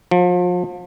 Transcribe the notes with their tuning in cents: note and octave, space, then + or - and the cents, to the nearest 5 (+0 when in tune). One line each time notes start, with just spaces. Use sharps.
F3 +35